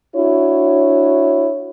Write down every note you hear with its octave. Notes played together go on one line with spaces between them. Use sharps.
D4 E4 F#4 C#5